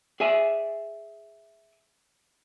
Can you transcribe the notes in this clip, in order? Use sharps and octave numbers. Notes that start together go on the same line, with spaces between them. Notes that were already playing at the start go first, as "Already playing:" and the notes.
G#4 D5 E5 G#5